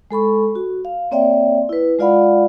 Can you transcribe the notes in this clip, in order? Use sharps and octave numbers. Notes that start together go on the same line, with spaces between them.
G#3 A4 B5 C#6
F#4
F5
A#3 C4 C#5 D5 E5 G5
E4 B4
G#3 F4 D5 F5 F#5 B5